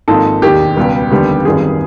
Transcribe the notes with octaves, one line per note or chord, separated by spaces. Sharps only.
G#1 G#2 F3 A#3 D#4 A4
E1 D#2 D#3 G4
C#2 B2 G3 B3
F1 D#2 D3 G3 B3
G#1 F#2 D#3 G3 B3 G#4